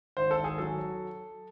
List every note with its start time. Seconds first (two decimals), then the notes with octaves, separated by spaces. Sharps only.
0.17 G#1 C5
0.31 A4
0.39 G#1
0.44 G#4
0.58 F#3 A4